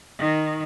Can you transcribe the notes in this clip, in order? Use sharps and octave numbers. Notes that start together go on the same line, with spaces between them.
D#3